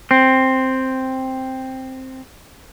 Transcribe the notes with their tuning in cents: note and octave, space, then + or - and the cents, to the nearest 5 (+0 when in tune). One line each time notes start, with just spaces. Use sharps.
C4 +5